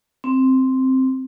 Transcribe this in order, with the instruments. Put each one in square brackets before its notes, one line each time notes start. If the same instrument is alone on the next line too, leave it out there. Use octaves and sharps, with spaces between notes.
[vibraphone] C4